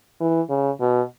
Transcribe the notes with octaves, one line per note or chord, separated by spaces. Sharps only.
E3
C#3
B2